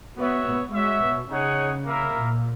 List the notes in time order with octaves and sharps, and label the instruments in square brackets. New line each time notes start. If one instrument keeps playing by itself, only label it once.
[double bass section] B3 [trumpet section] F#4 C#5 E5
[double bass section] B3
[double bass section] G#3 [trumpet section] F#4 C#5 E5
[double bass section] B2
[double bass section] C#3 [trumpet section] D#4 G#4 C#5 F#5
[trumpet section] A#3 E4 A#4 E5
[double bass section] A#2